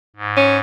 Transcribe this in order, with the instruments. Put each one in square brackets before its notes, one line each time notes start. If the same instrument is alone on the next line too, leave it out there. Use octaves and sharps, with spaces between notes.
[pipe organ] G#2
[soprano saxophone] C#4